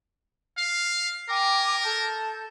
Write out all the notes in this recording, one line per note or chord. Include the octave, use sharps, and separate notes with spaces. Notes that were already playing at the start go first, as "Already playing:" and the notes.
F5
A#4 G5 G#5 D6
A4 A5 G6